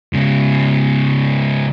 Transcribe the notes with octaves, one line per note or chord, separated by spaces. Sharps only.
G#2 C#3